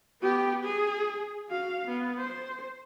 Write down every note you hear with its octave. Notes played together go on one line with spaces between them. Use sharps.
B3 G4
G#4
F#4 F5
B3
C5